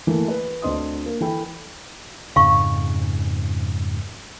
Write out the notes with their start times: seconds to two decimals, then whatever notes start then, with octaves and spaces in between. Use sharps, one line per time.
0.07 E3 A3 A#3
0.28 B4
0.62 D2 D3 C4 D#5 C6 D#6
1.06 A#3
1.21 E3 A4 G5 B5
2.36 F2 G#2 C#3 F5 C#6